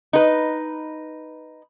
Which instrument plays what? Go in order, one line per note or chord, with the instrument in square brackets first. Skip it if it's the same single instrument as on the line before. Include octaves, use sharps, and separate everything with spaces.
[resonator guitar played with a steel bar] D#4 B4